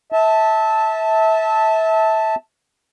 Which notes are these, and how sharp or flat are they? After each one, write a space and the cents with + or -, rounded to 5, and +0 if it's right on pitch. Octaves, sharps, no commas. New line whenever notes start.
E5 -25 A5 +0